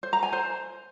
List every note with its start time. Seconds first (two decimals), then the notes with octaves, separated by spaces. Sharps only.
0.03 C5
0.13 A#5
0.23 G#5
0.33 C5